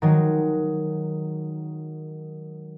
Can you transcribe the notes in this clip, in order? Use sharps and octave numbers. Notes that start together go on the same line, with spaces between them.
D#3 F#3 G#3